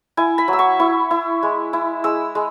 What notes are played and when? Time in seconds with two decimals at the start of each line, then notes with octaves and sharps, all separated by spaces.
0.17 E4 G#5
0.38 B5
0.48 F#3
0.53 E6
0.59 C#6
0.79 E4 C#6
1.11 E4
1.43 G#3
1.73 E4
2.04 G#3 E6
2.35 G#3